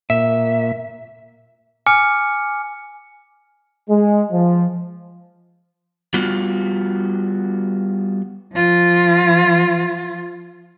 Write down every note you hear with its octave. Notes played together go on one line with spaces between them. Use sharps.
A#2 E5
G#5 D6 F6 C#7
G#3
F3
G3 B3 F4 F#4
F3 F4